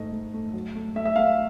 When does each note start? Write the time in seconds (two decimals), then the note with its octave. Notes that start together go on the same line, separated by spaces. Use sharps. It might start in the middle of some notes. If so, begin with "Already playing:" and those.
Already playing: G#2 A3 D#5
0.12 A3
0.34 A3
0.53 F#3
0.75 A3
0.95 A3 E5
1.05 E5
1.16 A3 F5